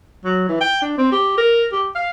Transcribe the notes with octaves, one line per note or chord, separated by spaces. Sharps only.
F#3
E3
G5
D4
C4
G4
A#4
G4
F5